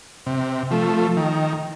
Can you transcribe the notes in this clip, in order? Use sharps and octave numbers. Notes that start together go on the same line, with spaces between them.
C3
F3 A3
D#3